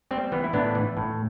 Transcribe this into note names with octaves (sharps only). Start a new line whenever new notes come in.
G3 C4
E3 B3
E4
A2 B3 D4
E3
A2